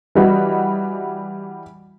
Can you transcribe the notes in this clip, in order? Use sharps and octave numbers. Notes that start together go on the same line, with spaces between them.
E3 G3 F#4 D#5